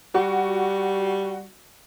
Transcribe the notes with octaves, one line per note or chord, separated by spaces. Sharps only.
G3 F#4